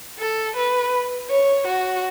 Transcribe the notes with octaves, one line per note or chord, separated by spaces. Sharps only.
A4
B4
C#5
F#4